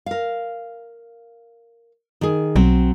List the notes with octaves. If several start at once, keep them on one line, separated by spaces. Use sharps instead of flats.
A#4 F5
D#3 G#4
B1 F#3 C4